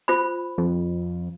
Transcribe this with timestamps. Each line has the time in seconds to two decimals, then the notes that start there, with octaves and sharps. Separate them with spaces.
0.08 F4 C5 B5
0.58 F2